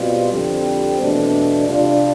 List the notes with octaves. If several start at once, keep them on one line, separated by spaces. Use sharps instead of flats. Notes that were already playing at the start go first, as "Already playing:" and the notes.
Already playing: B2 G3 C4 F4
F2 D3 G3 C4
E2 B2 A3 D4
C3 G3 D4 F4